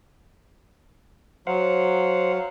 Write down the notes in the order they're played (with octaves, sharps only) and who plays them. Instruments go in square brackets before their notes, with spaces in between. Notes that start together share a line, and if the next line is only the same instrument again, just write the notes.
[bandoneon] F#3 [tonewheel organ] C5 F5 F#5